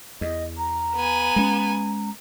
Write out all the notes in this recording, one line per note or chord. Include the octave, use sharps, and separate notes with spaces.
E2 D#5
A#5
B3 G#5
G#3 C#4